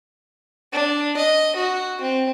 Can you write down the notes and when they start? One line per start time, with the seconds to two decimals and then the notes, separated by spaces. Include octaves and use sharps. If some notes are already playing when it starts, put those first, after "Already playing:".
0.73 D4
1.17 D#5
1.56 F#4
2.01 C4